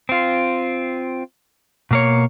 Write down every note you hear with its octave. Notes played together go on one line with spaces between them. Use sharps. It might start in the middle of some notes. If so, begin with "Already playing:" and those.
C4 F4
B2 A#3 C#5